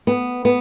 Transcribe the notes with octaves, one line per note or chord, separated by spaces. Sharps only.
B3
B3